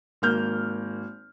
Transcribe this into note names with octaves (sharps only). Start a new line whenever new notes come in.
G#1 A#3 F6 G6